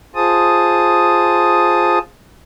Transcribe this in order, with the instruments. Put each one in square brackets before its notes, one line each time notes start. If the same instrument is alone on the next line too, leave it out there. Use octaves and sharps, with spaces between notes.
[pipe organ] F4 G#4 C5 A5 D#6